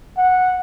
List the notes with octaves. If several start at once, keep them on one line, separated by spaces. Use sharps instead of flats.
F#5